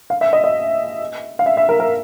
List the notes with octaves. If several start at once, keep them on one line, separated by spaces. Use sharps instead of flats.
F5
E5
D#5
D#5
F5
E5
E5
A#4
A#4